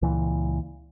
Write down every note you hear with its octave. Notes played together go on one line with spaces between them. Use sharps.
C#2 A#2 E3